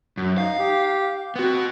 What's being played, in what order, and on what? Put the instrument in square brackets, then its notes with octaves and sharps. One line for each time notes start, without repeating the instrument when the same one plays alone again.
[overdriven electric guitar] F#2
[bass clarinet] D#4 [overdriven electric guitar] F5
[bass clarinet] G4
[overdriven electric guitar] B3 F#4 [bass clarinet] C4